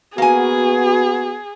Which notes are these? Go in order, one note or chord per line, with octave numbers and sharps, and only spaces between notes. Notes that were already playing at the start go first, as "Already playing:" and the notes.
A#3 B3 F#4 G#4 G#5